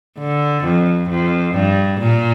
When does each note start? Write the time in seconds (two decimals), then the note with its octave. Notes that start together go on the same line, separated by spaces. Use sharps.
0.19 D3
0.64 F2
1.09 F2
1.54 G2
2.00 A#2